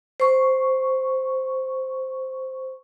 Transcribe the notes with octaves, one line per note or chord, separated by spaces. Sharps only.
C5 C#6